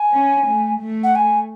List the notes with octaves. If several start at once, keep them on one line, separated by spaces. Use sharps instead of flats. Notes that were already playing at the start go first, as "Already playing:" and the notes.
Already playing: G#5
C#4
A3
A3
F#5
G#5